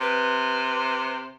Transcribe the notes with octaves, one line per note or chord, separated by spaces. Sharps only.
C3 B4